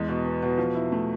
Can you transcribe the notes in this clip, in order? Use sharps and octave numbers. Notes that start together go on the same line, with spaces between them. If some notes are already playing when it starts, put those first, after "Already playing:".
Already playing: E2 G#3
B2
B3
B2
F3
E4
A3